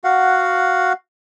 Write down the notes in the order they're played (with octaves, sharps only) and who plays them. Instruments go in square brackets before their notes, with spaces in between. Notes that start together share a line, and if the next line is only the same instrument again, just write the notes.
[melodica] F#4 F5 F#5